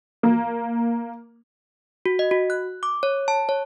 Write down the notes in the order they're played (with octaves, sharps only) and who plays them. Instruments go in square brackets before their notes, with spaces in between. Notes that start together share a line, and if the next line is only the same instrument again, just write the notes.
[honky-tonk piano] A#3
[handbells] F#4
D#5
F#4
F#6
D6
C#5
A5
C#5